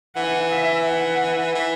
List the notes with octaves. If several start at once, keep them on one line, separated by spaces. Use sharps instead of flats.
E3 F#5
E5
F#5
E3